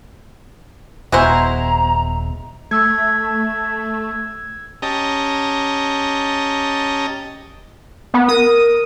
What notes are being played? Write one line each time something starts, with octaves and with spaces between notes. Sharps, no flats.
D#1 G#3 B3 E4 F#4 G#4 C5 A#5
A3 E6 G#6
C#4 G4 D#5 A5 A#5 D#6
B3
A#4 D#6